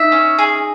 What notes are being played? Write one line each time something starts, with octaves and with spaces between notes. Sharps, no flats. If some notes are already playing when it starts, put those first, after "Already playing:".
Already playing: D#4 E5
C#4
G#4